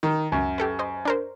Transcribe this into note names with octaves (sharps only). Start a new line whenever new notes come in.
D#3
C#2 F#2
G4 A4 B4
C5 D#5
D4 A#4 C5